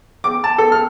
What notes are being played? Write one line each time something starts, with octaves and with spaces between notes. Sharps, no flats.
D6
A5
A4
F6